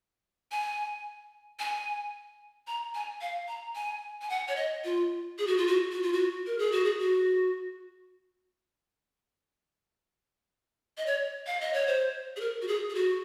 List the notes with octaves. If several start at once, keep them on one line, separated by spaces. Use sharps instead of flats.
G#5
G#5
A#5
G#5
F5
A#5
G#5
G#5
F#5
C#5
D#5
F4
G#4
F#4
F4
F#4
F#4
F4
F#4
A#4
G#4
F#4
G#4
F#4
D#5
C#5
F5
D#5
C#5
C5
G#4
A#4
F#4
G#4
G#4
F#4